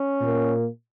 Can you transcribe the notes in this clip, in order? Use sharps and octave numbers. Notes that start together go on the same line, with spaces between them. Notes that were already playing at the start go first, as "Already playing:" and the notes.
Already playing: C#4
A#2 A#3